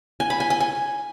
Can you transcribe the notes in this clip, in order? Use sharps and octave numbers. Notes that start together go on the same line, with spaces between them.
G#5
B5
G#5
G#5
G#5